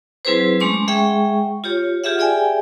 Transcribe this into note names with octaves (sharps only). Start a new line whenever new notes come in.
F#3 C4 E4 G#4 B4 C5
G#3 A3 C#4 A5 C6 D6
G#3 G#4 E5 F#5 G5 C#6
F4 G4 C#5
F4 G4 G#4 E5 F#5
G4 G#4 D5 E5 G5 G#5